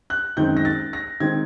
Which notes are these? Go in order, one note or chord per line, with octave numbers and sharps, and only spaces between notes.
F#6
F#2 D#3 G#3 C4 D#4 G6
A#6
A6
A#6
D#3 G#3 C4 D#4 G#6